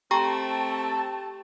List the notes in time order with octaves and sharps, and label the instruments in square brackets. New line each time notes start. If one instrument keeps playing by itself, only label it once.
[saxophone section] A3 C4 [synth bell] G4 G5 [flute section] A5 [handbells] A#5 C#6